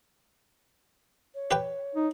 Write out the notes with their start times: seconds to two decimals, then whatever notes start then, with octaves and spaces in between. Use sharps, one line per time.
1.35 C#5
1.51 G4 B4 G5
1.95 D#4